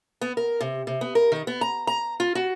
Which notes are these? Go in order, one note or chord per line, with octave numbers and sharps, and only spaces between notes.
B3
A#4
C3
C3
B3
A#4
D#3
B3
A#5
A#5
F4
F#4